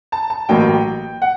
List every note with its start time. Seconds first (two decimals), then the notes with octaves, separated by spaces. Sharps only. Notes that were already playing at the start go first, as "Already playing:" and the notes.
0.12 A5
0.30 A5
0.49 A1 A2 F#3 A#3 G5
1.22 F#5